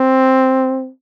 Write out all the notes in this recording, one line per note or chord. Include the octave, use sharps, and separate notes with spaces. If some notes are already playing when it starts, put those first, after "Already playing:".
Already playing: C4